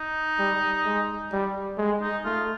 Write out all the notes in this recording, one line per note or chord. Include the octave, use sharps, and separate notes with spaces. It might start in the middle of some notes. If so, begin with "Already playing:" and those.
Already playing: D#4
G3
G#3
G3
G#3
D#4
A3 F4